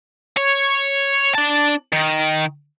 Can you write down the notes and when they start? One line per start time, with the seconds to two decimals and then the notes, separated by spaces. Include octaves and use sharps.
0.37 C#5
1.35 D4 A5
1.93 D#3